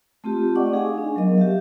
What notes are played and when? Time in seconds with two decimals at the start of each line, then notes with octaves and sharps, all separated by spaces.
0.24 A3 C4 F4 G4
0.55 D5 D#5 F#5 G5 C#6 D6
0.72 D#4 G#4 F5 G#5
0.98 D4
1.16 F#3 B3 A#4 D#5
1.38 G4 E5 F5